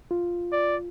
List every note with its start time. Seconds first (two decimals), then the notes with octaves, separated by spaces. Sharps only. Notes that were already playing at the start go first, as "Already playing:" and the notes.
0.11 F4
0.52 D5